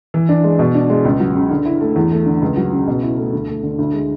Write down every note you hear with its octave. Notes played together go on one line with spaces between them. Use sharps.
E3
D4
G#3
B2
D4
G#3
C#2
F#3
C#3
D3
E4
A3
E2
A3
D3
C#2
F#3
C#3
B2
E4
A3
D2
A3
D3
D2
G#3